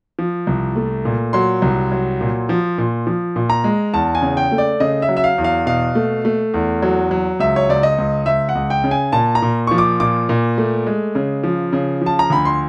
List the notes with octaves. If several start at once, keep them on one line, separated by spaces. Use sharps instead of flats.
F3
C2
A3
A#2
F#3 C6
C2
F#3
A#2
F3
A#2
F3
A#2
A#5
G#3
E2 A5
G#5
C#3
G5
A3
D5
C#3 D#5
E5
F#3
E5
F5
E2
F5
B2 F5
A3
A3
E2
F#3
F#3
C#2 E5
C#5
C#2 D5
D#5
C#2
C#2 E5
F#5
C#2
G5
C#3
G#5
A#2 A5
A#5
A#2
F3 C#6
D6
A#2 D6
A#2
A3
G#3
C#3
F3
C#3
F3 A5
A#5
D2 B5
C6